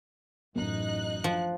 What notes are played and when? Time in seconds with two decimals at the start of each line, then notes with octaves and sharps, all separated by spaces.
0.55 A1 F#2 D#4 F#6
1.24 F3